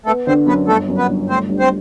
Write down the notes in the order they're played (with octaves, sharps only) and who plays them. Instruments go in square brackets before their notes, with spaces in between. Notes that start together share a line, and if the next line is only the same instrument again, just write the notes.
[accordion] A3 A4 [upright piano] B3
[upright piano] D3 [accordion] C4 C5
[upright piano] F#2 [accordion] B3 B4
[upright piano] G1 [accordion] A3 A4
[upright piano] F#2
[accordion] B3 B4
[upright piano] G1
[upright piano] A3 [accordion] C4 C5
[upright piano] G2
[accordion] C4 C5